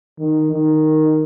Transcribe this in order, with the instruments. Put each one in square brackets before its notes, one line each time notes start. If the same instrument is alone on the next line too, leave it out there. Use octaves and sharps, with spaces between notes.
[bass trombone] D#3
D#3